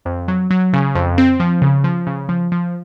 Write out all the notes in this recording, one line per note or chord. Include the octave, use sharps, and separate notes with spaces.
F2
F#3
F#3
C#3
F2
C4
F3
C#3
F3
C#3
F3
F3